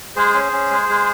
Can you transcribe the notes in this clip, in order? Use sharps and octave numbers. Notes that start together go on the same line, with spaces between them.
G#3 G#4 C5
C#4
C#4
G#3
G#3